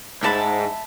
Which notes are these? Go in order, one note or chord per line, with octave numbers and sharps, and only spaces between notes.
C2 G#2 E5 A5 B5